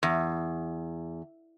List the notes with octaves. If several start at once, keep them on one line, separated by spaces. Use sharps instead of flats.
E2